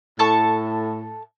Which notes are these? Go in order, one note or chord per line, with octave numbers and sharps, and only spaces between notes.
A2 A4 A5 C#6